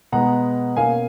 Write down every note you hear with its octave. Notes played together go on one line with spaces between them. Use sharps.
B2 G#3 B3 F#5 A#5
B2 A#3 C#4 F5 G#5